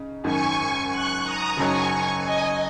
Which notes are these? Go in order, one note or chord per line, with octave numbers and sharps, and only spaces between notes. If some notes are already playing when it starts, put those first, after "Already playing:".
Already playing: C#3 D#4
G#1 F#2 D#3 G#5 C#6
C#6 F#6
A#5 D#6
F#1 F#2 F#3 D#4 G#5 C#6
D#5 G#5